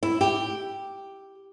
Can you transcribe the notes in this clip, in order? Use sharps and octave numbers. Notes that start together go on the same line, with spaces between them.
E4
G4